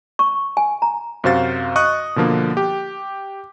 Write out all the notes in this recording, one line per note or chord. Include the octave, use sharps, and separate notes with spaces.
C#6
G#5
A#5
F#2 C3 F#4 C5 F5 A6
D#5 C#6 D#6 F#6
B2 D3 F3 A#3
G4